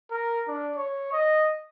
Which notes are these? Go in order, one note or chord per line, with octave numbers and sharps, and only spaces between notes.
A#4
D4
C#5
D#5